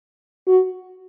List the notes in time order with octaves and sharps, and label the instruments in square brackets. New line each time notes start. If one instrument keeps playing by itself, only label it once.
[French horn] F#4